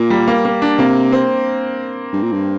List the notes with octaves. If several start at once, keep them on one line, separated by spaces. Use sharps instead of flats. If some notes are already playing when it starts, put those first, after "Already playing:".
Already playing: A#2 A#3
G3
A#3
A#3
D4
C3 A#3
C4
G2
A#2
G2